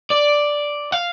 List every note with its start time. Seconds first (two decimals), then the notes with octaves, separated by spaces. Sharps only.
0.11 D5
0.92 F5